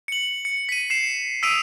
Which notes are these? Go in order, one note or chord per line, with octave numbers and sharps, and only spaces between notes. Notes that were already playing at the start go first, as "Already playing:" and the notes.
C#7 F#7
C#7
B6 D#7
C7 E7
D#6 E6 B6 D7 D#7 F7